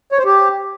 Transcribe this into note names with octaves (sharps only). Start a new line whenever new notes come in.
C#5
C5
G4